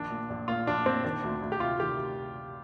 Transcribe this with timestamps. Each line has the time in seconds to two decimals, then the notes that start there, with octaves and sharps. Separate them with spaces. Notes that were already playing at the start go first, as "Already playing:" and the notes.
Already playing: A#1 D#3 D4
0.11 A#2
0.30 A#1
0.48 A#2 F4
0.67 A#1 D4
0.86 A#2 C4
1.04 D#3 D4
1.24 D2
1.42 D2
1.52 G4
1.60 C3 F4
1.80 D#3 G4